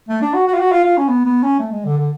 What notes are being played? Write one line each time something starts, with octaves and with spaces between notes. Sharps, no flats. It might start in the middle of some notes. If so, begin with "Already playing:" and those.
A3
D4
F#4
F#4
F4
F#4
F4
F4
C#4
B3
B3
C#4
A3
G#3
D3
D3